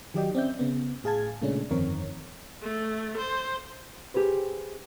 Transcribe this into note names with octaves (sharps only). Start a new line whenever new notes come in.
D#3 F#3 G4 D5 D#5 G5
C4 C#4 D5 E5 G6
C#3 B3
A2 G#4 F5 A5 G#6
A#2 C#3 G#3 A3 C#4 D4
G1 F2 D#3 C4 A#4 C#5
A3
C5
G4 G#4 B4 C5